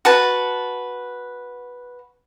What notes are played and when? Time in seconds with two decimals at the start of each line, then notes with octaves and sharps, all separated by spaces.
0.05 F#4 B4 A5